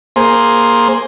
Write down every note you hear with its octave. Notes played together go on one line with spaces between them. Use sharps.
A#3 G#4 C5